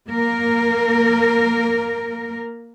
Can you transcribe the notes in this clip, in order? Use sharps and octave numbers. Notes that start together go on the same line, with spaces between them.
A#3 A#4